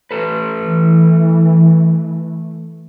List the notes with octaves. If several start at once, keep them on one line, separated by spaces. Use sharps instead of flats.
A3 A4 B4
E3